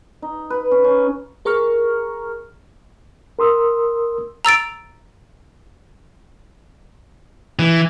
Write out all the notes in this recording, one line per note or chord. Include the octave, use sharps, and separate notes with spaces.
D#4
B4
C#4
C#4
G#4 A#4 A#5 C#6 F6
A#4 C6 D#6 E6
A#5 E6 A6 D7
E3